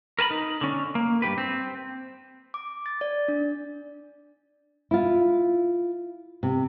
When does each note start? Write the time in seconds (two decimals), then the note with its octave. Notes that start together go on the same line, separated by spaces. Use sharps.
0.19 A#4 B4 A5 B5
0.31 D#4
0.61 D3 C#4
0.95 A#3
1.22 G2 C#3 G4 B4
1.38 C4
2.54 D6
2.86 A6
3.01 D5
3.28 D4
4.91 E4 F4
6.43 C3